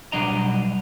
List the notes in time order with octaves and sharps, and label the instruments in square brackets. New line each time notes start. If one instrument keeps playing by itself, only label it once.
[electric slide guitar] B2 F#3 G3 D4 D#5 A#5